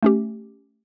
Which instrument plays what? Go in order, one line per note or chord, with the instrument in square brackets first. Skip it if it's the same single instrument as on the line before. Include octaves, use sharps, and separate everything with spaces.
[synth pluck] A3 C#4 G4